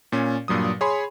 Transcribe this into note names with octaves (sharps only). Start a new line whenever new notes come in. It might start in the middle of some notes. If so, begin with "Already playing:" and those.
A#2 C#4
G2 A#2 F#3 D#6
G#4 C#5 G#5 B5 C6